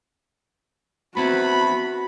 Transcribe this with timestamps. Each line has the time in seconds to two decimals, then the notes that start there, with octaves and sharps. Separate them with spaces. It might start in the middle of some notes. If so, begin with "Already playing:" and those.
1.17 B3 C4 E4 F#4 B5